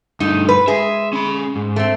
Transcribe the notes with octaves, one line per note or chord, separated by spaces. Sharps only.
G2 A3 D#4
B4
G#3 G#4 E5
C#4 B5
G#2
A3 C4